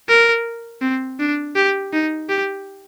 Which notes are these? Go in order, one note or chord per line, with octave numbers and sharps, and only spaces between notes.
A#4
C4
D4
G4
D#4
G4